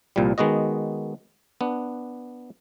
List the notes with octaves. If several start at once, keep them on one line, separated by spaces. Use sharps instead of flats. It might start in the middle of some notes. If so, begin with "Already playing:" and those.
C2 A#2 F3 G3
D#3 G#3 B3 F#4 D#5
B3 D4